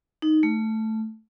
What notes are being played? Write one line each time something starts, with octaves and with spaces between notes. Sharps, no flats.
D#4
A3